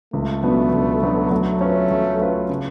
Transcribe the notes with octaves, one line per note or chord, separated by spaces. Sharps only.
C#2 A3
B2 F#3 B3 D4
C#2
B2 F#3 B3 D4
F#3 A3
C#4 F4 B4
F#3
C#4 F4 B4
C#3